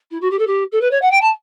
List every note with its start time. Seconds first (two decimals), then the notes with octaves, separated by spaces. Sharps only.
0.11 E4
0.21 F#4
0.31 G4
0.39 A4
0.47 G4
0.72 A4
0.81 B4
0.91 C#5
1.02 F#5
1.11 G5
1.21 A5